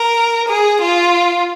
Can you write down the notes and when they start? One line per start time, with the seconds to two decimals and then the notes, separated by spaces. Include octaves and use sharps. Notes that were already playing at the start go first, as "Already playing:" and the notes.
Already playing: A#4
0.48 G#4
0.81 F4